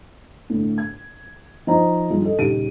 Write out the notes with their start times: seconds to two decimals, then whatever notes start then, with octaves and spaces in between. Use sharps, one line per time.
0.50 A2 D3
0.78 G#6
1.67 F3 D#4 C5 D#5 A#5
2.10 G2 D#3 F3 G#3 D#4 F4
2.24 A4 D#5
2.38 D#1 C#3 D#4 G4 D7 D#7